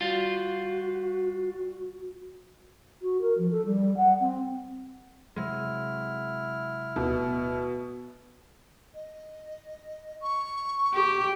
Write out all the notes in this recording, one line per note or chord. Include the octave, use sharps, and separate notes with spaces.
G3 F4 F#4
F#4
A#4
F3
A4
G3
F#5
C4
C3 F#3 G#3 E4 F6
D1 D2 B2
D#5
C#6
G4